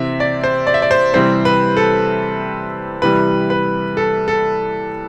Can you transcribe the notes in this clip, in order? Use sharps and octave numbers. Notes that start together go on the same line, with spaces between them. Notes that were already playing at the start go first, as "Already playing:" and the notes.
Already playing: C3 E3 C4 E5
D5
C5
D5
E5
D5
C5
C3 E3 G3 C4 C5
B4
A4
C3 E3 G3 B4
B4
A4
A4